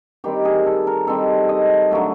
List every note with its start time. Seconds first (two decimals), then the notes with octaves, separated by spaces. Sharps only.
0.24 D#3 G3 C4 G4
0.45 G#4
0.66 A4
0.87 A#4
1.07 D#3 G3 C4 A4
1.49 D#5
1.91 D3 F#3 A3